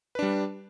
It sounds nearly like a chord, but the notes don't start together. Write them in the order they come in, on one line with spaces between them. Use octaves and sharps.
B4 D4 G3